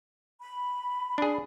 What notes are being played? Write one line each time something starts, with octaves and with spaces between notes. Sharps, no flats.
B5
D4 G#4